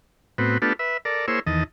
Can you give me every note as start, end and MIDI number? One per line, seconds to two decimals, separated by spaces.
0.38 0.58 45
0.38 0.58 59
0.38 0.58 60
0.38 0.58 66
0.62 0.73 57
0.62 0.73 59
0.62 0.73 62
0.62 0.73 65
0.62 0.73 67
0.62 0.73 69
0.79 0.97 71
0.79 0.97 76
1.05 1.26 69
1.05 1.26 70
1.05 1.26 74
1.28 1.40 58
1.28 1.40 64
1.28 1.40 68
1.28 1.40 72
1.28 1.40 73
1.28 1.40 88
1.47 1.64 40
1.47 1.64 51
1.47 1.64 75
1.47 1.64 81